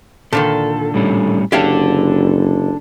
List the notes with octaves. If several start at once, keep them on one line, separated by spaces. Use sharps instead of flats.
A#2 D3 D#3 A4
A2 G3 C#4
F#1 D4 G4 A4 C#5 F5